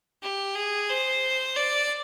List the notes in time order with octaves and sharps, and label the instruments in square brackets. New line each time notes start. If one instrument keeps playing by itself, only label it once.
[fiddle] G4
G#4
C5
D5